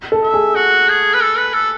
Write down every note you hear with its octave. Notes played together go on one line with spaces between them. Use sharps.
A4
E5
G#4
F#4
G#4
B4
A4
B4
A4